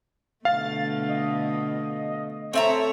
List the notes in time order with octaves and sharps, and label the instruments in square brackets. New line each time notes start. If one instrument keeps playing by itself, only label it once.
[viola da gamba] B2 D3 A3 [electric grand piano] F5 [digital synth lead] A6
[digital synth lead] D#5
[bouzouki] C4 E5 A#5 [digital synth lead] A4 [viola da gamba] C#5